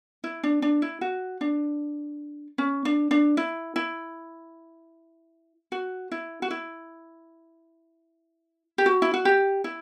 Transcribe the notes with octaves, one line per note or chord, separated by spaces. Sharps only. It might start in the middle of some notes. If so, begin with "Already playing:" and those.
E4
D4
D4
E4
F#4
D4
C#4
D4
D4
E4
E4
F#4
E4
F#4
E4
G4
F#4
E4
F#4
G4
E4